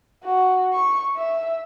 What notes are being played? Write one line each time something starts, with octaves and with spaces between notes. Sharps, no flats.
F#4
C#6
E5